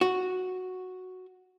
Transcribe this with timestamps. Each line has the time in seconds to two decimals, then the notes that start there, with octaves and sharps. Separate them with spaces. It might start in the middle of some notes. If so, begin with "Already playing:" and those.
0.01 F#4